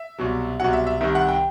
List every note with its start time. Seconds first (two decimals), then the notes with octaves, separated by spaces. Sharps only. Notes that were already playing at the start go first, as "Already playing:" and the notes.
Already playing: E5
0.18 C2 B2 F#3
0.59 C2 B2 F#3 F#5
0.73 E5
0.87 E5
1.01 C2 C3 D#3 E5
1.15 F#5
1.28 G5